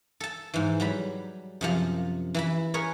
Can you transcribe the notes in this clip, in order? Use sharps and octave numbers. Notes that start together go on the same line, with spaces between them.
A4 A5
G#2 E3
F#3 G3 B5
F#2 C3 F3
E3 E4 B5
G#4 A#4 B4 C#5